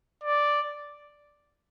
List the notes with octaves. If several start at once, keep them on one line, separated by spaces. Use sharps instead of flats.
D5